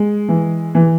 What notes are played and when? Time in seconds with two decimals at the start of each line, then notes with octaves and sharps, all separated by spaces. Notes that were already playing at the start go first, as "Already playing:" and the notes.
Already playing: G#3
0.29 E3
0.75 E3